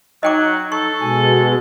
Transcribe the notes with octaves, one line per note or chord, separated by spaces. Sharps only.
F#3 D#4 D#5 G5 D6
A4 C#6
B2 G#3 G#5